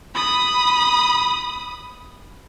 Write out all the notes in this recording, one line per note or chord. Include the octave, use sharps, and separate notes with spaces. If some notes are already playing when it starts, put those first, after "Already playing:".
B5 D#6